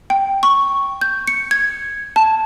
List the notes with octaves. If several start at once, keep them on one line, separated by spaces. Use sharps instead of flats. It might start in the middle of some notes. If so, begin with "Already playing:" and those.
G5
C#6
G6
C#7
G#6
A5